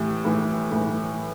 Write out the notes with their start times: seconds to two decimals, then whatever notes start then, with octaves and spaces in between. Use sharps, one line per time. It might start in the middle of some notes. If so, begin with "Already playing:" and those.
Already playing: A2 E3 G4
0.25 A2 E3
0.71 A2 E3